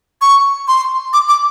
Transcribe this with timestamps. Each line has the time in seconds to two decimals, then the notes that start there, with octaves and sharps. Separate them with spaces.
0.22 C#6
0.68 C6
1.13 D6
1.29 D6